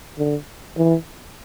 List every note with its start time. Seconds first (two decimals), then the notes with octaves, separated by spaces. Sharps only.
0.19 D3
0.77 E3